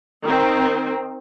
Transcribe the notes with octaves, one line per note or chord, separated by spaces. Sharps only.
D#3 C4